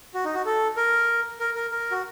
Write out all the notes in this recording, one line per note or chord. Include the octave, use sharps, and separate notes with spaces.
F#4
D#4
F#4
A4
A#4
A#4
A#4
A#4
F#4